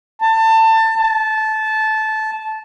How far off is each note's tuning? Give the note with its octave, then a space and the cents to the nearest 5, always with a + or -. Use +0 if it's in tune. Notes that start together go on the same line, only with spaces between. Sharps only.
A5 +25
A5 -15